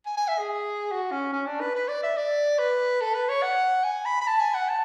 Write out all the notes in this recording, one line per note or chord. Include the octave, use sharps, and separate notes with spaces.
G#5
G#5
E5
G#4
F#4
C#4
C#4
D4
B4
B4
D5
E5
D5
B4
A4
B4
C#5
F#5
G#5
B5
B5
A5
G#5
F#5
A5